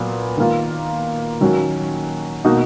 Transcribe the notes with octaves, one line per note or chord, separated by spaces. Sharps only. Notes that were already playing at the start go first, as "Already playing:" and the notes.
Already playing: A#2 F#3 B3
D#3 A#3 F4
D#3 F#3 C#4 F#4
B2 A#3 D#4 F#4